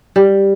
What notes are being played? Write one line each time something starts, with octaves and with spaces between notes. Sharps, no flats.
G3